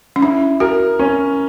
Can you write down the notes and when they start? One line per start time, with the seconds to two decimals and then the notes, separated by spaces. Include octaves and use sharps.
0.16 C#4
0.22 D4 E4
0.60 F#4 A#4
0.99 C#4